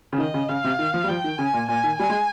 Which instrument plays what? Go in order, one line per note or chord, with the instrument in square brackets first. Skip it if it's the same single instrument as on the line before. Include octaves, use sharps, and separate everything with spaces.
[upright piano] C#3
[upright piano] D#3 [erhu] D#5
[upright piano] C#3
[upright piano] C#3 [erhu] F5
[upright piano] C3
D#3
F3
G3
[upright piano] F3 [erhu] G5
[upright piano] D#3
[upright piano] C#3 [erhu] G#5
[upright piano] A#2
[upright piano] A#2 [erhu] G#5
[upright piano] D#3
[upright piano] G3 [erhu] G#5
[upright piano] G#3